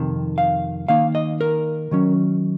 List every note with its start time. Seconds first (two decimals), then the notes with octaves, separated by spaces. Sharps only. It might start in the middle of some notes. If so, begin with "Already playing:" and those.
Already playing: F2 C3 D#3
0.38 F5
0.88 D#3 A#3 D#4 F5
1.15 D#5
1.41 A#4
1.91 D#3 F#3 C#4